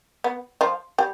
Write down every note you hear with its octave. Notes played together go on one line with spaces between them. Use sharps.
B3
F3 F4
G3 G4